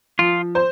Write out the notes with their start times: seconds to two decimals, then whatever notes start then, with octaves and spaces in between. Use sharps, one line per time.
0.19 F3 F4
0.55 C5